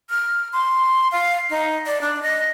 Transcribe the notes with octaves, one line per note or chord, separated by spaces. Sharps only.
F6
C6
F5
D#4
D5
D4
D#5